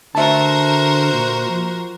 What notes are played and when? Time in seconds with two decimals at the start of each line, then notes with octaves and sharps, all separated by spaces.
0.15 D3 F#4 A#4 C5 E5 A5
1.12 A#2
1.49 F3